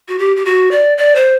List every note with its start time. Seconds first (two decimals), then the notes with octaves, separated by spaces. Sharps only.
0.08 F#4
0.19 G4
0.37 G4
0.45 F#4
0.71 D5
0.98 D5
1.15 C5